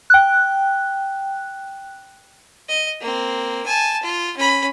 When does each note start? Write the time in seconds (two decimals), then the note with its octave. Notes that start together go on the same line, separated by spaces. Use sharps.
0.10 G5 F#6
2.69 D#5
3.01 A#3 C4
3.66 G#5 A5
4.03 F4
4.37 C#4 B5